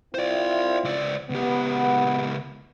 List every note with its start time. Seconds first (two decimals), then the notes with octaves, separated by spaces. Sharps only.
0.14 C4 E4 F4 C5 D5
0.84 C#2 D5
1.30 C#2 B3 G4